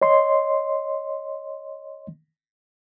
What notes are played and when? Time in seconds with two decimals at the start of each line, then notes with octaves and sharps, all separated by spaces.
0.02 C#5 D#5 C6